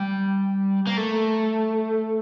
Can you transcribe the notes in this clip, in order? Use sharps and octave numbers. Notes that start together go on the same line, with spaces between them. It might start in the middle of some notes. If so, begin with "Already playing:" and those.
Already playing: G3
A#3
A3